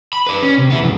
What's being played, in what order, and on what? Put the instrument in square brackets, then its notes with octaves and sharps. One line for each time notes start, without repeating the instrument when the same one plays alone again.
[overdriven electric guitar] B5
B4 D5
C#4
C3
B3 E4
G#2 F3